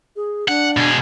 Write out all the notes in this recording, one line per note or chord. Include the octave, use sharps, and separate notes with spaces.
G#4
D4 F#5
B2 G#4